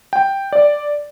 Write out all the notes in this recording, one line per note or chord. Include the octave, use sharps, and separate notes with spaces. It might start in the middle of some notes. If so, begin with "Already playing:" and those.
G5
D5